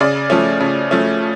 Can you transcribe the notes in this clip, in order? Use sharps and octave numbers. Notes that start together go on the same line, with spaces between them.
C#3 D5
F3 A3 C#4
C#3
F3 A3 C#4